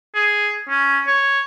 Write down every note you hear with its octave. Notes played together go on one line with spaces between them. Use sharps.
G#4
C#4
C#5